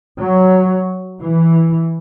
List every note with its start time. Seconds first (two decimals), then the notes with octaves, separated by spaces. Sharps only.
0.18 F#3
1.21 E3